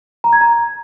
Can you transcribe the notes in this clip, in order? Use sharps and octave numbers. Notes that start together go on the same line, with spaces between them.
A#5
G#6
A#5